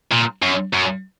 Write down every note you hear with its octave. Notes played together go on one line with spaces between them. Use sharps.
A#2
F#2
F#2